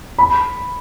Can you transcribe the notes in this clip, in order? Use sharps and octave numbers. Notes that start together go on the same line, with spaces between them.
B5